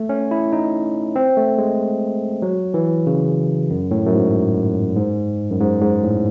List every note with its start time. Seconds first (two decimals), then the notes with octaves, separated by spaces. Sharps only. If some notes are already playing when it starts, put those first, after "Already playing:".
Already playing: A3
0.09 C#4
0.31 E4
0.52 D#4
1.16 C4
1.37 A3
1.58 G#3
2.42 F#3
2.74 E3
3.07 C#3
3.70 F#2
3.91 A2
4.06 F#2
4.13 G#2
4.96 G#2
5.51 F#2
5.61 G#2
5.81 G#2
6.03 A2